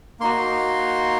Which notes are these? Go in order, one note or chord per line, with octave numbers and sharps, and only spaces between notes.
A#3 D#4 F#4 C6